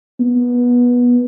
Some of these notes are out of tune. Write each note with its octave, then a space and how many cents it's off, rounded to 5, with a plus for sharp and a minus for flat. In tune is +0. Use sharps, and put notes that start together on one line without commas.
B3 -20